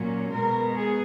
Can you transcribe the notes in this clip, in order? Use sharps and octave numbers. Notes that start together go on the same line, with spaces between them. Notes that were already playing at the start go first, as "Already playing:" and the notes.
Already playing: A#2 F#3 A#3 C#4
B2 G#3 B3 A#4
G#4